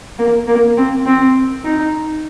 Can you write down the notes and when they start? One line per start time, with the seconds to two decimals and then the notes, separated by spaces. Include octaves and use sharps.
0.19 A#3
0.47 A#3
0.77 C4
1.06 C4
1.64 D#4